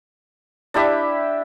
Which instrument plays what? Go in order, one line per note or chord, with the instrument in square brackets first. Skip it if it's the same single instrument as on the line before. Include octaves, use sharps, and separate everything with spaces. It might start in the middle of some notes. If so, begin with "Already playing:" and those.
[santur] D4 E4 G4 E5